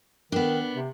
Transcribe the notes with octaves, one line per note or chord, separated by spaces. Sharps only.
D#3 B3 D4
C3